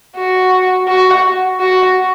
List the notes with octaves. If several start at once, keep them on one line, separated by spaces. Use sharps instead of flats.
F#4
F#4
F#4